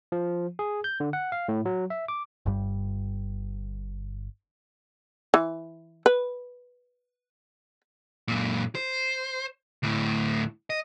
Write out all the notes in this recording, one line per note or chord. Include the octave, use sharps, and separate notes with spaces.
F3
G#4
G6
D3
F#5
F5
A2
F#3
E5
D6
G1 G2 G3
E3
B4
F#2 A#2
C5
D2 A2
D#5